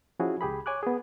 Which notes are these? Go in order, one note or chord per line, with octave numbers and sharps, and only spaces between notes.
F3 C#4 E4 F#4 G#4
C#2 G4 G#4 B5
C#5 G#5 D6 F#6
B3 G#4